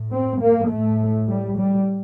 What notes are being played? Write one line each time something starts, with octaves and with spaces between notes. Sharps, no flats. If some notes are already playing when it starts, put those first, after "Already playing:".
Already playing: A2
C4
A#3
A2 A3
G3
G3